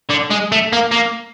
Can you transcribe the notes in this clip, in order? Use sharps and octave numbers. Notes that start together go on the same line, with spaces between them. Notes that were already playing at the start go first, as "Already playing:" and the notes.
D3
G#3
A3
A#3
A#3